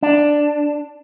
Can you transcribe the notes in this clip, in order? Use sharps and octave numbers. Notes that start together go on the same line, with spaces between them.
D4